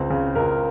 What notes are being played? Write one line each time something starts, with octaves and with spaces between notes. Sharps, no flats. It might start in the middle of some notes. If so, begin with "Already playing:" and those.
Already playing: C#2 C4
C#3
C#2 A#4